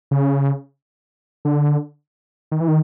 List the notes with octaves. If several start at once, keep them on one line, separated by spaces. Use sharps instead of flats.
C#3
D3
D#3
E3
D#3